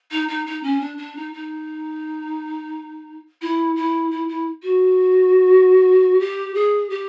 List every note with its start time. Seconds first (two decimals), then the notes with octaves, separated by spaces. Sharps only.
0.11 D#4
0.28 D#4
0.46 D#4
0.62 C#4
0.80 D4
0.97 D4
1.16 D#4
1.33 D#4
3.41 E4
3.75 E4
4.10 E4
4.28 E4
4.62 F#4
6.19 G4
6.54 G#4
6.89 G4